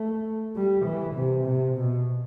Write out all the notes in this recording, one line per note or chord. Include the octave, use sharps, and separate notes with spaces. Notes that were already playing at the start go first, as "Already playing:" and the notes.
Already playing: A3
G3
E3
C3
C3
B2